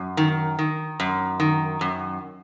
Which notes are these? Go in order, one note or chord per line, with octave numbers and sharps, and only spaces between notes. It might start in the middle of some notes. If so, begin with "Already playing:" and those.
Already playing: F#2
D#3
D#3
F#2
D#3
F#2